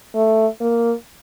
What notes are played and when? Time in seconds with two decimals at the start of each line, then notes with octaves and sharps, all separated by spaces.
0.15 A3
0.60 A#3